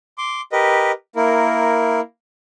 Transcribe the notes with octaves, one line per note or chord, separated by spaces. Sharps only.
C6 D6
G4 A#4 B4 D#5
A#3 E4 A#4